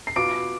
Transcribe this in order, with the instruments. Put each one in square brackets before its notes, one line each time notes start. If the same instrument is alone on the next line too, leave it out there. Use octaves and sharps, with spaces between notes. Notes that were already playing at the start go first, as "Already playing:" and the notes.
[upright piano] C7
[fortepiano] B2 B3 F4 [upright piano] D6 D7